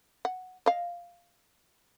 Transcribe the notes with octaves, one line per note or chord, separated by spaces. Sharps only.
F#5
D#5 F5